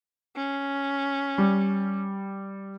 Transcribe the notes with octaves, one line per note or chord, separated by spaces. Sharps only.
C#4
G3